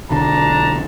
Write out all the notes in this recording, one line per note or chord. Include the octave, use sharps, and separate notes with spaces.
B1 D3 D4 A5 A#5